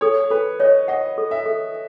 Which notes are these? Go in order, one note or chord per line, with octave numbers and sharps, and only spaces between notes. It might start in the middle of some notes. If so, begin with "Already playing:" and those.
A4 C#5
A4 B4
C#5 D#5
D#5 F#5
A4
E5
A4